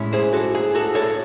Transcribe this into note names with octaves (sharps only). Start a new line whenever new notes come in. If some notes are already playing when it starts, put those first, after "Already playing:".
Already playing: A2 G#3 C#4 E4
G#4 C5
F#4 A4
G#4
F#4 A4
A4 C#5